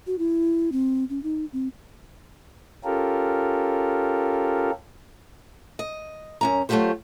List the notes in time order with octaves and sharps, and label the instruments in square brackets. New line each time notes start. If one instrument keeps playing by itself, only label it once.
[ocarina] F#4
E4
C4
C#4
D#4
C4
[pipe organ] C#4 F4 G4 A4 A#4
[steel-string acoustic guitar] D#5
F#2 C#4 A#5
F#3 A3 A#3 F4 G4 C5